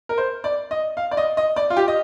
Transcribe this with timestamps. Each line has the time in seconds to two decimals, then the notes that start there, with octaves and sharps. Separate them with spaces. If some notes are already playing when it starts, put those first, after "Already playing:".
0.09 A#4
0.18 C5
0.44 D5
0.71 D#5
0.97 F5
1.11 D5
1.17 D#5
1.37 D#5
1.56 D5
1.70 F4
1.77 G4
1.88 D#5